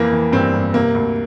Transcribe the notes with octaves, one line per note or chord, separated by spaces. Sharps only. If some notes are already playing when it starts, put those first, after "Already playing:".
Already playing: F2 E3 A#3
E3
G2 C4
G2
C3 A#3
D2